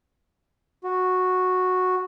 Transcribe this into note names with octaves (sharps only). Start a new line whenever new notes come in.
F#4